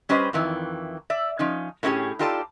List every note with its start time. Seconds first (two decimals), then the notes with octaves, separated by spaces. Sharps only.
0.09 G3 C#4 G4 B4 C5 D#5
0.33 F2 D#3 E3
1.10 D5 E5
1.39 F3 C#4 D#4
1.83 A2 A3 C#4 F4 G4 G#4
2.19 D#4 F4 G4 A4 D5 A5